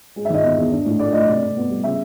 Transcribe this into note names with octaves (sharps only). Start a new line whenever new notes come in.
G#3
E5
D#3 D#5
E2
E2
D4
A2
A3 D5
A3 D#5
C3 D5
C3
B3
G3
C#3 E5